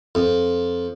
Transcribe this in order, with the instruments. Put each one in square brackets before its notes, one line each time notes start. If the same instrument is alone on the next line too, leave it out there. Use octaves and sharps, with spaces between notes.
[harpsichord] F2